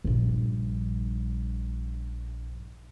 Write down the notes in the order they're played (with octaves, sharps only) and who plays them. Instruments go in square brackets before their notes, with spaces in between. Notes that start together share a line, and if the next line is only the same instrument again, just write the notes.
[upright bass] A#1 G2